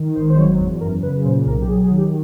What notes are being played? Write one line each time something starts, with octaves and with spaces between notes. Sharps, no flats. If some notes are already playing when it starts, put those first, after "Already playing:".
Already playing: D#3
G#1 C5
C5
F#3 C#5
E2
F#2 A#4
C#3 B4
A#2 C5
B1 A#4
G4
F#3 G#4
G#4
D#3
G4